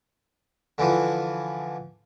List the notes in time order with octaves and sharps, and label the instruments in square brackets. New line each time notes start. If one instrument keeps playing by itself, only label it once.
[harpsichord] D3 E3 F3 F4